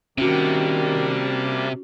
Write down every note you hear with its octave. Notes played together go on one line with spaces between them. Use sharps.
C3 D#3 G3 A#3 C#4 D4 F#4